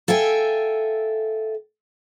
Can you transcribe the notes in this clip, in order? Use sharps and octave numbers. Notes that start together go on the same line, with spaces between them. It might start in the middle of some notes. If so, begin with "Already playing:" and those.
A4 E5 F5 G5 G#5